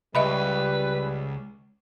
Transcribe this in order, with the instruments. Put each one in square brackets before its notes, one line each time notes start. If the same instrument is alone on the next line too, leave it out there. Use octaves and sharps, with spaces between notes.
[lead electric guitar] C#2 [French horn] G3 [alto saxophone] B4 [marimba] D#5 E5 B5